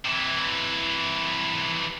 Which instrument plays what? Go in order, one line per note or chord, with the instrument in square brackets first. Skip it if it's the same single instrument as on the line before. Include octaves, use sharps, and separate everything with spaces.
[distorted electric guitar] C3 E3